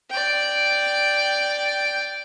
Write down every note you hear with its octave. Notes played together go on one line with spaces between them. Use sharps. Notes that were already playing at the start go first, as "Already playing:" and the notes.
D5 G5